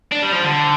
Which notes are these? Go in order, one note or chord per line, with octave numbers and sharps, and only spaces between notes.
D4
G3
F3
D3